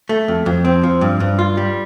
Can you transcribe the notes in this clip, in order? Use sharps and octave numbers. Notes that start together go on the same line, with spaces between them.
A3
F2
F2
C4
F3
G2
G2
F4
G3